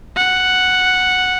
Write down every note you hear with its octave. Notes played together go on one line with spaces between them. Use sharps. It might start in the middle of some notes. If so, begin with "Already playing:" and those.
F#5